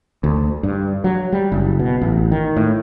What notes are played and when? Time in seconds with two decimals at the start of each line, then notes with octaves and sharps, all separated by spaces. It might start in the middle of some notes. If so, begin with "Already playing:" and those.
0.24 D2
0.63 G2
1.04 F#3
1.33 G3
1.52 F#1
1.80 B2
2.01 A1
2.31 D#3
2.57 A2